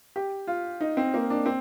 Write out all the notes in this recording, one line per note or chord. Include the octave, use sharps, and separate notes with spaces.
G4
F4
D#4
C4
A#3
D4
C4